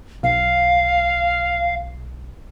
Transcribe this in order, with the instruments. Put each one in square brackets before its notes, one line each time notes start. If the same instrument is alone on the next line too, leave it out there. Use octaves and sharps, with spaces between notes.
[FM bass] B1 [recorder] F5